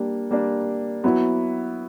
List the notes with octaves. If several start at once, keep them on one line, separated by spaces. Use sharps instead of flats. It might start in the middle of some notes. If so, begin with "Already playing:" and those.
Already playing: G3 A#3 D4
G3 A#3 D4
F#3 B3 E4